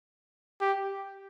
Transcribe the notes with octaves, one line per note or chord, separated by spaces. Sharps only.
G4